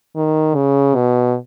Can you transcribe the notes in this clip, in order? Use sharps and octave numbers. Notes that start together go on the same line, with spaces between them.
D#3
C#3
B2